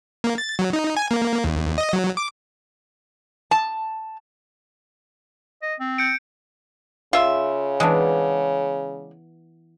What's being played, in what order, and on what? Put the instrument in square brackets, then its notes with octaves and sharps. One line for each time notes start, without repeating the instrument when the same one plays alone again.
[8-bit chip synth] A#3
A6
F#3
D#4
G#5
A#3
D#2
D#5
F#3
D6
[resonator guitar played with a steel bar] A5
[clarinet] D#5
C4
[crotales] G6 C#7 D7
[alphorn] C#3 [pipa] F4 E5
[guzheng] E3 B3 [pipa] G#3 D4